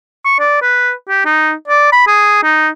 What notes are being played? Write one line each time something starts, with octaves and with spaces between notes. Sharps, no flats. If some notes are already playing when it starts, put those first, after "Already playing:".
C#6
D5
B4
G4
D#4
D5
B5
G#4
D#4